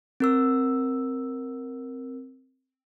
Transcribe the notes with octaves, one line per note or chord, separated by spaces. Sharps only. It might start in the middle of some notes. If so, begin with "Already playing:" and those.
C4 A#4 E6